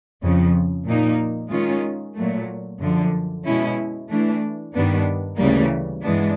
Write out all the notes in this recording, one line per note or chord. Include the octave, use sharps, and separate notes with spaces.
F2 C#3 F3
A#2 F3 A#3 D#4
D#3 G#3 C#4 F4
A#2 F#3 A3
F#2 D3 F3
B2 G#3 C#4 E4
E3 A3 D4
G2 D#3 G3 B3 D4
D2 C#3 E3 G3 A#3
G2 E3 G#3 B3 D4